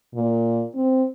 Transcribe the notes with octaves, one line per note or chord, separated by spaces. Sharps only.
A#2
C4